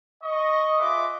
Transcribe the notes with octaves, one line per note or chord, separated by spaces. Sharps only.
D#5 C#6
F4 G#4 B4 D#5 E5 D6